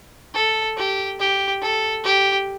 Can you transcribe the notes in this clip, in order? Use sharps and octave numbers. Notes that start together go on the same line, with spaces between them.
A4
G4
G4
A4
G4